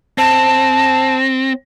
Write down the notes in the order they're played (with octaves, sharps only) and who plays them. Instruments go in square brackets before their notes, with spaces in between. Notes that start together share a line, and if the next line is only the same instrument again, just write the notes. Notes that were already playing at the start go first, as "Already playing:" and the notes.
[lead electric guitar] C4 [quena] A5